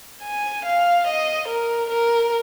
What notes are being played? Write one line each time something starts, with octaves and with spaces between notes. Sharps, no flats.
G#5
F5
D#5
A#4
A#4